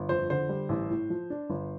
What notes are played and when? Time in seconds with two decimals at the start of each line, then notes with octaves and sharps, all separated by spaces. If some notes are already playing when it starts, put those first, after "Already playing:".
Already playing: G1
0.09 F2 C5
0.30 D3 C5
0.49 G3
0.69 A1
0.90 A2
1.10 F3
1.30 D4
1.50 G1